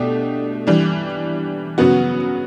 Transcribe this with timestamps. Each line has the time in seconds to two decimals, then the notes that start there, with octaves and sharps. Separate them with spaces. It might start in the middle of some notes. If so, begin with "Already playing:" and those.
Already playing: B2 A3 D4 G4
0.67 E3 G3 D4
1.78 C#3 F#3 B3 F#4